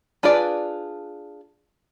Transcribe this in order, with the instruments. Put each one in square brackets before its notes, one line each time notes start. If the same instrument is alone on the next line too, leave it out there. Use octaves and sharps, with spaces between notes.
[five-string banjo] D4 F4 G#4 B4 D5